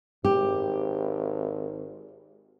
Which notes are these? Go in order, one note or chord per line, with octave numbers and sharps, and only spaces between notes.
G#1 G4